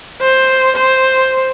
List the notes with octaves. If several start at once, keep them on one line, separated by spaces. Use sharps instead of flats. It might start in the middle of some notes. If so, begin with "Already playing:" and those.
C5
C5